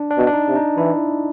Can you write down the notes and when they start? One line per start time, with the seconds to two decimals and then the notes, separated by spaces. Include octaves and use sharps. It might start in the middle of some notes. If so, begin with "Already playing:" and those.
Already playing: D4
0.11 D4
0.18 B2
0.27 D4
0.33 D#4
0.48 C3
0.56 D#4
0.77 E3 E4